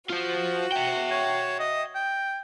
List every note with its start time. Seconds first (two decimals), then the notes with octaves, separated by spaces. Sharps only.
0.10 F4 F#4 C5
0.72 E5 G5
1.11 C#5
1.59 D#5
1.95 G5